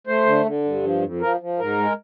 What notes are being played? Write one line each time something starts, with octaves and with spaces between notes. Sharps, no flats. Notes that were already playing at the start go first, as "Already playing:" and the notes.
A3 C5
D3
D3
G2
F3
F2
F3 A#4
F3
G#2 A#4
G#3